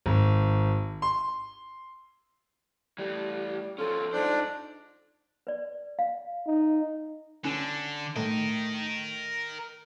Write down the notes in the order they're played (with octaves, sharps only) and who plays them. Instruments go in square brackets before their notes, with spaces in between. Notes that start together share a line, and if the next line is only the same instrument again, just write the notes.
[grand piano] G#1
C6
[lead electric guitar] E3 A3 [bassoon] G3
[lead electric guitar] F3 C#4 [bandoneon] F4 [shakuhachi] A4
[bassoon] F2 [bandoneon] D4 D5 [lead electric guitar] D#4 C5
[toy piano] B4 D5
F5
[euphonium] D#4
[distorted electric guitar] D3 [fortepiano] C#4
[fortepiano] A2 [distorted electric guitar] A#4 D#5